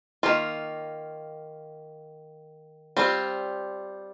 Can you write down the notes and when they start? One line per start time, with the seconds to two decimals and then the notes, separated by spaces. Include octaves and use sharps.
0.23 D#3 A#3 F4
2.97 G3 C4 F4